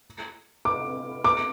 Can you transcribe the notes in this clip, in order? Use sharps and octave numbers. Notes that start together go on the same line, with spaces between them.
D6
D6